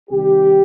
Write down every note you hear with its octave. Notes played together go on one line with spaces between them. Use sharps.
C2 C3 D#3 G3 G4